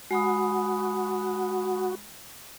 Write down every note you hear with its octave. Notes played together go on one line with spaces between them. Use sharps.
G#3 F#4 B5 D#6